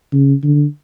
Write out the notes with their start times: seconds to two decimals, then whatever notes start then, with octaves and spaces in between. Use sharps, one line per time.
0.13 C#3
0.44 D3